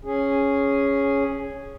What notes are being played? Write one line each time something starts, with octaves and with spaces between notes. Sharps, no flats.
C#4 G#4